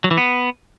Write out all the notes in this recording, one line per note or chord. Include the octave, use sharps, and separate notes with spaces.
F#3
E3
B3